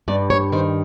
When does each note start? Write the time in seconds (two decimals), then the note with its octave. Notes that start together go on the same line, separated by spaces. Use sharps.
0.08 G2 D5
0.30 C#5
0.52 D#3 C5